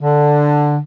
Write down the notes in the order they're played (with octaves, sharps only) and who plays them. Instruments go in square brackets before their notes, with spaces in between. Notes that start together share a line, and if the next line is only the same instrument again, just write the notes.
[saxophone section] D3